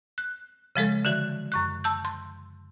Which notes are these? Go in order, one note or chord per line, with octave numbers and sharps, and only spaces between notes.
F#6
C#3 F3 G#3 A4
D3 E3 F#4
F#2 C#6 F#6
A5 E6 G6
C6